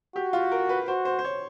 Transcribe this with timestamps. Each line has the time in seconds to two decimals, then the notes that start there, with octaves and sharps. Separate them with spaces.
0.16 F#4 G4
0.33 F4
0.52 A#4
0.69 B4
0.88 F#4 C5
1.05 C5
1.19 C5
1.24 C#5